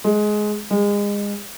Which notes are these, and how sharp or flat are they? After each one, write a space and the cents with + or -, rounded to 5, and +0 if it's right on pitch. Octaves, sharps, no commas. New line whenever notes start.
G#3 +15
G#3 -30